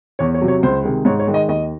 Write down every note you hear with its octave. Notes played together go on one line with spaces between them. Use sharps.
E2 C#5
C#5
C3 F#3
C#5
C#2 C5
C3 D#3 G#3
G#2 C#5
C#5
D#3 G#3
D#5
D#2 D#5